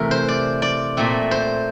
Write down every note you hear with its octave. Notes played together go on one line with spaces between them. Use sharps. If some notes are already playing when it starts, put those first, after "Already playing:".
Already playing: C3 E3 A3 A#4
C5
D5
D5
A#2 A3 C4
C5